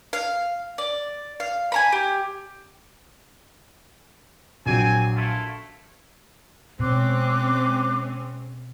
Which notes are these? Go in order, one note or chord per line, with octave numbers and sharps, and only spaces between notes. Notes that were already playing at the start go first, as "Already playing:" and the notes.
F5
D5
F5
G#5 A#5 B5
G4
A#1 F#3 C4 G#5
A3 E4 F4
B2 G#3 C4 C#4 C6 D6 F#6